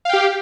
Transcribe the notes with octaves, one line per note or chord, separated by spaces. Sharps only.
G4 F5 G5